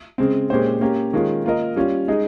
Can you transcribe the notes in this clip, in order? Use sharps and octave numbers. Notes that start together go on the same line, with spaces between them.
C#3 G#3 C4
A#2 G#3 C#4 G4 C5
A#3 C#4 G4
D#3 G#3 C#4 F4
A#3 F4 A#4 D#5
G3 C#4 F4
G#3 D#4 G#4 D#5